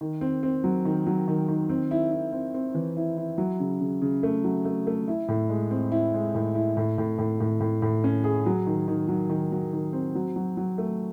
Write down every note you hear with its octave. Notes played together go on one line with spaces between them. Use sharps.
D#3
C4
C4
F#3
D#3
F#3
D#3
D#3
C4
E4
E4
C4
C4
E3
E4
E4
F#3
C#3
C#3
C#3
A3
F#3
A3
A3
E4
A2
G#3
C4
E4
G#3
A2
E4
A2
A2
A2
A2
A2
A2
C#4
G#4
F#3
D#3
D#3
F#3
D#3
F#3
D#3
C4
F#3
F#3
F#3
A3